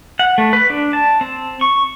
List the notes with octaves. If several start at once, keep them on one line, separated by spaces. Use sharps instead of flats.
F#5
A3
B4
D4
A5
C4
C#6